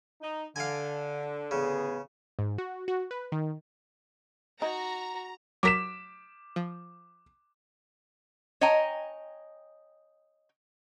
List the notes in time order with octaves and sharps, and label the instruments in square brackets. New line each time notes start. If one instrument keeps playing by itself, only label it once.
[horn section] D#4
[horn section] D3 [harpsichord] F5 G#5
[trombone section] A1 B3 G#4 [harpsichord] C#3
[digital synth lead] G#2
F#4
F#4
B4
D#3
[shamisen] D#4 [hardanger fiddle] F#4 [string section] A#5
[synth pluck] F#3 A#4 [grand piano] D6 B6 E7
[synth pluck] F3
[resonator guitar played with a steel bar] C#5 D#5 G5 G#5 A#5